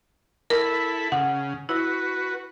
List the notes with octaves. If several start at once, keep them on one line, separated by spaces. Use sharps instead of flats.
E4 A4 A#4 B5
C#3 F#5
E4 F#4 B4